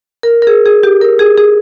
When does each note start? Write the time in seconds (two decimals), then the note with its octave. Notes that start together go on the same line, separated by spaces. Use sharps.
0.23 A#4
0.42 A#4
0.47 G#4
0.65 G#4
0.83 G4
1.01 A#4
1.19 G#4
1.38 G#4